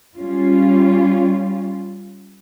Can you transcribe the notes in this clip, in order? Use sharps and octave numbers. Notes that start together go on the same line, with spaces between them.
G3 C#4 F4